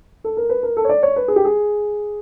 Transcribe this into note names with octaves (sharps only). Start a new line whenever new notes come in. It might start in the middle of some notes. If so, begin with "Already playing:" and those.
A4
A#4
B4
A#4
A4
C#5
D5
C#5
B4
G#4
G4
G#4